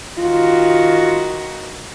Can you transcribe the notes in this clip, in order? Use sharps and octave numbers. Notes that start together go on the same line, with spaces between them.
D#3 F4 F#4